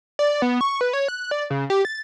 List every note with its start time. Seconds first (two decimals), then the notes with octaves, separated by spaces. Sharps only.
0.19 D5
0.42 B3
0.61 C#6
0.81 B4
0.93 C#5
1.08 F#6
1.31 D5
1.50 C#3
1.70 G4
1.85 A6